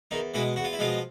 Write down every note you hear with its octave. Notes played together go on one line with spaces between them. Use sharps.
E2 D#3 D#4
B2 E3 G#3 E4
E2 F#4
F4
E4
B2 F3 G#3 F4